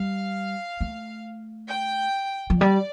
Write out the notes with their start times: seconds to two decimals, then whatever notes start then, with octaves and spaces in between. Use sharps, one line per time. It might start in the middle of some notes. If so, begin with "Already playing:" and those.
Already playing: G3 F5
0.81 A3
1.71 G5
2.50 F3
2.60 G3 D5